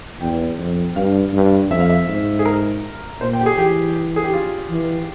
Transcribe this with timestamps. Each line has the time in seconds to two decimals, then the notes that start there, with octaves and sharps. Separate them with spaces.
0.21 E2 G5
0.58 F2
0.96 G2 F5
1.33 G2
1.70 F2 E5
1.80 F5
1.89 E5
2.09 G#2
2.39 G#4
2.45 A#4
3.20 A#2 C5
3.33 G5
3.41 G4
3.46 G#4
3.58 E3 G4
4.16 G#4
4.24 G4
4.33 F4
4.70 E3